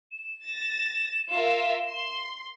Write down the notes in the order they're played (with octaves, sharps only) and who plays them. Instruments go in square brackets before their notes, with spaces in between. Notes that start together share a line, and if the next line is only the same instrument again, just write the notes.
[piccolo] E7
[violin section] A6 A#6
F4 A#4 E5
C6